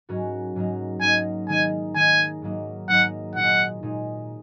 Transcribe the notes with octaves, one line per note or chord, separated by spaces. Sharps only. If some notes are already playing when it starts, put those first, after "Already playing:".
G#2 F#3 C#4 F#4 A#4
G#2 F#3 A#3 D#4 A#4
G#2 F#3 A#3 D#4 A#4 G#5
D#3 G#3 D#4 A#4 G#5
D#3 G#3 D#4 A#4 G#5
G#2 F#3 A#3 D#4 A#4
G#2 F#3 A#3 D#4 A#4 F#5
A#2 G#3 D#4 F#5
A#2 G#3 D#4